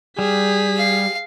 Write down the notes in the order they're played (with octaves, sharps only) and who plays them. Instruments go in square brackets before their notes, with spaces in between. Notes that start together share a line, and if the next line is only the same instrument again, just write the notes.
[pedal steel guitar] G3 [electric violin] G#4 B6
[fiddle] F5